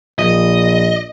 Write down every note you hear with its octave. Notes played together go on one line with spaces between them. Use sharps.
A#1 D#5